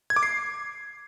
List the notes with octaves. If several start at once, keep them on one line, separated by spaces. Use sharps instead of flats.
G#6
D6
C7